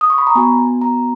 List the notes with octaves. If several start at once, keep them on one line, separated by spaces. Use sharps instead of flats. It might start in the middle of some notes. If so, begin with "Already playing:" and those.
D#6
C#6
B5
A#5
B3 F#4 G#5
A#5